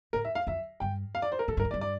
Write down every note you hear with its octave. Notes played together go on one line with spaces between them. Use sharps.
A2 A#4
E5
F5
F2 E5
G2 G5
F5
D5
C5
A#4
A2 A4
G2 A#4
F2
D5
G2
D5